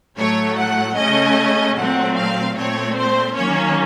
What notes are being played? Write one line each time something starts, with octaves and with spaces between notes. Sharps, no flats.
A2 F#3 A3 C#5
F#5
C#3 A3 C#4 D#5
A#2 F#3 A3 C4 F#5
F5
A#2 A3 C4 C#5
C5
D#3 F#3 A#3 C#4 C#5